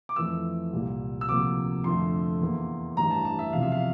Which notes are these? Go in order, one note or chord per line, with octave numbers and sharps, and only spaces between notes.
D6
F2 E3 A3 E6
C2 A#2 G3 A#3
E6
D2 C3 F3 A#3 D6
F2 D3 A3 C6
E2 E3 A#3
A1 G2 E3 A#5
A5
A5
E5
E2 C3 F3 F5
E5
F5